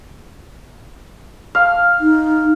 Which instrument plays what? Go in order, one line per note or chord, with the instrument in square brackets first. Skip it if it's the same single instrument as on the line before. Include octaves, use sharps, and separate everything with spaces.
[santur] F5
[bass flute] D#4